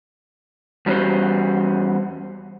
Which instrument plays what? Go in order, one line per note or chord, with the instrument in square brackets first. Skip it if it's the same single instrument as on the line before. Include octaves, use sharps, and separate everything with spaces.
[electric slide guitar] E2 G3 C#4 F#4 C5